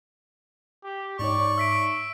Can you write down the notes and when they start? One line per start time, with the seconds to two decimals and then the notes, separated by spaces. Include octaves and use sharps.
0.84 G4
1.19 G#2 D#4 C#5 D5 C#6
1.58 E5 E6 B6 D7